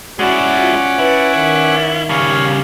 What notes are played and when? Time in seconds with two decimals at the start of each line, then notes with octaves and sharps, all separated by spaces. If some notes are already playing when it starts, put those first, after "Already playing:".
0.19 G#3 C#4 E4 F#4 D5 F#5
0.60 F4
0.99 E4 B4
1.36 D#3
2.09 C#3 G3 C#5 F5